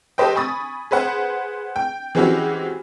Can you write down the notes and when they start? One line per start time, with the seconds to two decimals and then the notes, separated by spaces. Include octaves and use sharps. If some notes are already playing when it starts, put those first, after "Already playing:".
0.18 G4 A4 B4 C5 D#5 G5
0.35 G#5 B5 C#6 D#6 A6
0.91 G#4 B4 C5 F#5
1.76 G5
2.15 E3 G#3 C4 C#4 F#4 G4